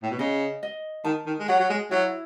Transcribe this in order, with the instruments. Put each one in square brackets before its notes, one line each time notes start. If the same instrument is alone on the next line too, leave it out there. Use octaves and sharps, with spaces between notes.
[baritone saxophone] A2
B2
[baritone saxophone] C#3 [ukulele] D#5
[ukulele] D#5
[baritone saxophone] D#3 [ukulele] A5
[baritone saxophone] D#3
G#3
[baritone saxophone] F#3 [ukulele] F#5
[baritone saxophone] F#3
G#3
[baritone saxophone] F#3 [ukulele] E4